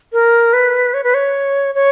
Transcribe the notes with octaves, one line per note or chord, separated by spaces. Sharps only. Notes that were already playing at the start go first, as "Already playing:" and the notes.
A#4
B4
C#5
B4
C#5
C#5